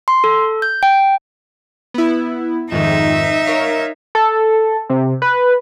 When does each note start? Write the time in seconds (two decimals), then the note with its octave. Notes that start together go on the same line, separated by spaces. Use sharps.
0.08 C6
0.24 A4
0.62 G6
0.83 G5
1.94 B3 E4
2.72 F2 G#2 D#3 D#4 E5
3.46 A#4 C#5 F5
4.15 A4
4.90 C3
5.22 B4